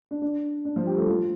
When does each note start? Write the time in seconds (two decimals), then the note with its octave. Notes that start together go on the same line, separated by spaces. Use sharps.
0.11 D4
0.22 D4
0.65 D4
0.76 F3 F4
0.87 G3 G4
0.98 A3 A4
1.08 F3 F4